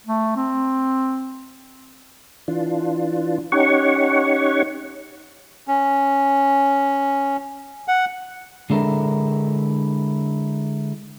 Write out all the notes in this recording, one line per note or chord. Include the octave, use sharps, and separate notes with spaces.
A3
C4
E3 D4 F4
C#4 D#4 G4 C#5 F#5 C#6
C#4
F#5
D3 G#3 D4 E4 A4 A#4